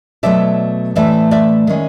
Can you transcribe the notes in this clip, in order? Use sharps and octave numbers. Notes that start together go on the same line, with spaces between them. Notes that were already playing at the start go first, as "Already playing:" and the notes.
B2 F#3 A3 D5 E5
A2 E3 A3 D5 E5
D5 E5
D#3 G#3 C#4